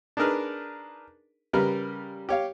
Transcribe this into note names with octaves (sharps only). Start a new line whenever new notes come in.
D4 D#4 G#4 A#4 B4
C#3 G3 A#4 B4
G4 C#5 F5